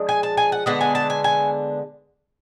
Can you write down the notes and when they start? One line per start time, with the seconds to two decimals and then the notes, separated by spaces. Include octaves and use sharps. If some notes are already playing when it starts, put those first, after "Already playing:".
Already playing: F3 G#3 D4
0.09 G#5
0.23 A5
0.37 G#5
0.52 F#5
0.66 D3 G#3 B3 D4 F#5
0.81 G#5
0.95 A5
1.10 G#5
1.24 G#5